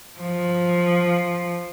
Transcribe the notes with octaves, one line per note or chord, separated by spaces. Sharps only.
F3